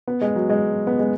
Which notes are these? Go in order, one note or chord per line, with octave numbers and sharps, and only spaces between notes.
B3
G#3
F#3
G#3
B3
G#3